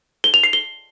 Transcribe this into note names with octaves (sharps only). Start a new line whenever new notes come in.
G7
F7
C7
G7